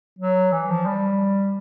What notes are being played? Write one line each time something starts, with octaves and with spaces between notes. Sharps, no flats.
F#3
E3
F3
G3